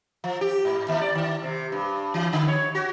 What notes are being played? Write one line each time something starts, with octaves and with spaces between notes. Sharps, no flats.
F3
G4
G#2
D#2
D5
D#3
C3
G2
E3
D3
C#5
F#4